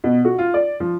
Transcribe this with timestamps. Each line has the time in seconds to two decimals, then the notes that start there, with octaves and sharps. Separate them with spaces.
0.04 B2
0.25 F#4
0.39 F4
0.54 D5
0.80 F3